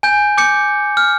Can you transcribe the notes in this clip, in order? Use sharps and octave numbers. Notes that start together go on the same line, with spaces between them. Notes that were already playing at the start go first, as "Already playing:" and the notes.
G#5 G6
D6 G6 C#7
F6